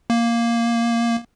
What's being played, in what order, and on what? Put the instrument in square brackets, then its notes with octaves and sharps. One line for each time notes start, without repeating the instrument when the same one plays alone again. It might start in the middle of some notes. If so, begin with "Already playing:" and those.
[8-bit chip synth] A#3